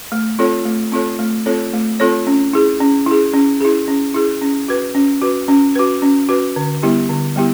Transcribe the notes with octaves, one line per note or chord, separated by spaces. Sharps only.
A3
C4 F4 A4 C#5
A3
C4 F4 A4 C#5
A3
C4 F4 A4 C#5
A3
C4 F4 A4 C#5
C#4
E4 G#4
C#4
E4 G#4
C#4
E4 G#4
C#4
E4 G#4
C#4
F#4 B4
C#4
F#4 B4
C#4
F#4 B4
C#4
F#4 B4
D3
G3 B3 E4 G4
D3
G3 B3 E4 G4